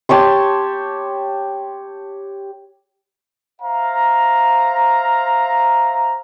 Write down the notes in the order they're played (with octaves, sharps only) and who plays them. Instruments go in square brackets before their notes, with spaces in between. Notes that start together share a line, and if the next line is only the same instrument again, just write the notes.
[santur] G4 C#5 A5 C6
[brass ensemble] C5 E5 F5 A#5